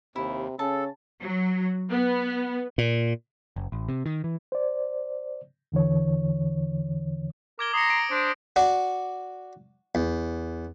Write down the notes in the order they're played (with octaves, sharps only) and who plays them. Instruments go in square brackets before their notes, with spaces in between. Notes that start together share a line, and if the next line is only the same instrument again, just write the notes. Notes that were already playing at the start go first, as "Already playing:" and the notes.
[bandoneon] D#2 [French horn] C3 [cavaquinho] E4
[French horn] C#3 [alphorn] C#4 [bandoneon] A4 [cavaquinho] A5
[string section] F#3
B3
[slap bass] A#2
[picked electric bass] F#1
A1
C3
D#3
E3
[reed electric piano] C5 D5
E2 D3 E3 C#5
[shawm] A#4 [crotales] D6 G#6 G7
[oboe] A#5 [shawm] C6 [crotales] D#6 A#6 C#7
[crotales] D7
[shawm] D4 [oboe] C5
[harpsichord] F#4 D5
E2